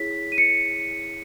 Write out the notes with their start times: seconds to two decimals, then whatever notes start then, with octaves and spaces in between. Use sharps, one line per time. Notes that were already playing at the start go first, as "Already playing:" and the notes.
Already playing: E4 G#4 C#5 B6
0.32 D#7
0.38 C#7